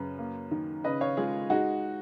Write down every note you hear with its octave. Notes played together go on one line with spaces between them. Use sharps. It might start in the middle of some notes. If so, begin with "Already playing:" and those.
Already playing: F#2 C#3 B4
A#3
D#3
C#3 B4 D#5
C#5 F5
G#3 F4 G#4
G#3 D#4 F#4